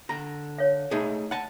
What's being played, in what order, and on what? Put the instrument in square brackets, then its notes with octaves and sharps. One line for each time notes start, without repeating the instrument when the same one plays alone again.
[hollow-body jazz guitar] D3 A#5
[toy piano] C#5 F5
[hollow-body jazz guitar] A3 D#4 G#4
F#5 A5